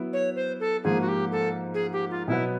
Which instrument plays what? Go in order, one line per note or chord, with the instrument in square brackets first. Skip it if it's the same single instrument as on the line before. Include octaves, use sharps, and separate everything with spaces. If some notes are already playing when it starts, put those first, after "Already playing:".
Already playing: [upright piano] F#3 B3 E4
[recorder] C#5
C5
A4
[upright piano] G#2 F3 A#3 [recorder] G#4
[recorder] F#4
G4
A4
G#4
G4
F4
[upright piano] B2 F#3 B3 [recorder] E4